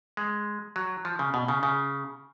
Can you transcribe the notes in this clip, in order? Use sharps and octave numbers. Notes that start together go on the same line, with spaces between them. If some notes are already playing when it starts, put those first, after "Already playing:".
G#3
F#3
F3
C#3
B2
C#3
C#3